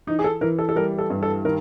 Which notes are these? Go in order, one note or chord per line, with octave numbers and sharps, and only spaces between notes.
E3 D#4
G#4
A4
E3 A#4
A4
A4
G3 A#4
A4
G2
A4
D#3 A#4